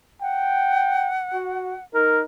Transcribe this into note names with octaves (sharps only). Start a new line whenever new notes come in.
F#5 G5
F#4
D#4 A#4